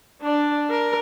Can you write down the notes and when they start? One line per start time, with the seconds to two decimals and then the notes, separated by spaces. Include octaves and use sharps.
0.22 D4 D5
0.70 A#4